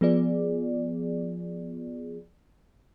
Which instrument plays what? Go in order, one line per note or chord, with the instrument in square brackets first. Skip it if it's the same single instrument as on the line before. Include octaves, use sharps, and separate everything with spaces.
[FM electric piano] F3 B3 F4 G#4 D5